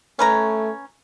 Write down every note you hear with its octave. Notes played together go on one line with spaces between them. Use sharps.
A3 C#4 B4 A#5